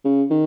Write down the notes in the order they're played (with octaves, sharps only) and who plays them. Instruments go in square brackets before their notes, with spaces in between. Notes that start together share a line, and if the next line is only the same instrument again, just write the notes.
[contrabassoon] C#3
D#3